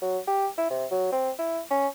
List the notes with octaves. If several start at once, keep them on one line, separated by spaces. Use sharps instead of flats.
F#3
G4
E4
C3
F#3
C4
E4
C#4